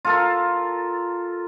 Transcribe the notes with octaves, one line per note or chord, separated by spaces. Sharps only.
F4 A4 A#4